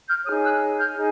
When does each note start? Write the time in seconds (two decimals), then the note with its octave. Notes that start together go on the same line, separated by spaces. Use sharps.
0.09 F6 G6
0.25 D#4 G#4 C#5 D#6 F6
0.43 E6 F#6
0.78 F6 G6
0.95 D#4 G#4